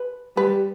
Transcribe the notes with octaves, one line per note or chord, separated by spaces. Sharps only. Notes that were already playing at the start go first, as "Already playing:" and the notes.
Already playing: B4
G3 B4